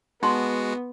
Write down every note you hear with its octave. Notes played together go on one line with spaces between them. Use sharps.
G#3 B3 D#4 F#4 C6